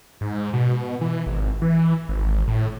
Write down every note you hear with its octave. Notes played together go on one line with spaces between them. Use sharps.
G#2
B2
E3
G#1
E3
G#1
A2